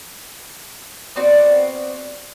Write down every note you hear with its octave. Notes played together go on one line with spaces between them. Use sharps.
B3 C4 F#4 D5